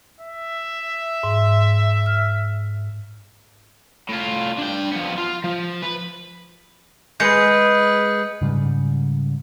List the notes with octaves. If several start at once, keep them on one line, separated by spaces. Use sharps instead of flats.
E5
G#2
F6
A2 F4
D4 G5
F3 B3
F4
F3
B4
G#3 G#4 B4 G6 C#7
G#2 C#3 G3